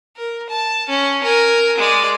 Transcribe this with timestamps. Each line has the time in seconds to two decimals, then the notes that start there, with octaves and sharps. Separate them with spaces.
0.17 A#4
0.50 A5
0.89 C#4
1.24 A#4 G#5
1.78 G#3 D5